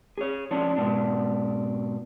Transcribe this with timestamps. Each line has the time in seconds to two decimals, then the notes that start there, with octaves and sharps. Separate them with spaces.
0.18 G#4 C#5
0.51 F3 C#4 D4
0.76 G#2 B2 D4